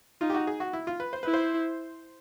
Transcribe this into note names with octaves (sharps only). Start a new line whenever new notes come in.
D#4 F4
G4
F#4
G#4
F#4
E4
F4
B4
C5
E4 B4
C5